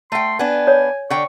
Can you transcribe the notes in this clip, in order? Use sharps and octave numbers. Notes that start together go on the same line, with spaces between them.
A3 G5 C6
B3 D4 G#5
C#5
D3 G5 C#6